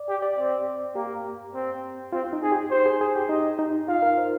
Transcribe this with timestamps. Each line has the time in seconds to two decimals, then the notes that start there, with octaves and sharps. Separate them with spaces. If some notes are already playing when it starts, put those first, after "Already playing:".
Already playing: D5
0.09 G4
0.22 D5
0.38 C4 D5
0.95 A#3 G4
1.54 C4
2.13 C4 F4
2.33 D#4
2.42 G#4
2.52 G4
2.71 C5
2.86 G#4
3.01 G#4
3.15 G4
3.29 D#4 D#5
3.59 D#4
3.89 F4 F5
4.02 A#4
4.18 C5